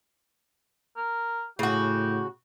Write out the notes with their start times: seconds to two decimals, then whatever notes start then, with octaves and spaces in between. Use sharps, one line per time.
0.97 A#4
1.59 A2 C#3 F#4 G4